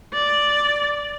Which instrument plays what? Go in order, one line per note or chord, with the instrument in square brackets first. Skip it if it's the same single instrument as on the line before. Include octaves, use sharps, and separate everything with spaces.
[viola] D5